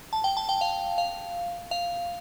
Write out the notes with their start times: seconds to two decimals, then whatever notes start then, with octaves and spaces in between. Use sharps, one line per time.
0.13 A5
0.24 G5
0.37 A5
0.49 G5
0.61 F5
0.98 F5
1.71 F5